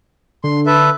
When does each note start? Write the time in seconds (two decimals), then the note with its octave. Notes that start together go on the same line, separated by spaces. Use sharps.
0.44 D3 C6
0.66 A4 B4 E5